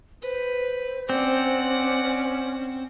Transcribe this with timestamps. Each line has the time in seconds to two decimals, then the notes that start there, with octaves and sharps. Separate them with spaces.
0.23 B4 C5
1.10 C4 C#4 D5 F#5